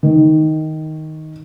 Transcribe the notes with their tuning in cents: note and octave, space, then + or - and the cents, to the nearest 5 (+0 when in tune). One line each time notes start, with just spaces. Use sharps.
D#3 +5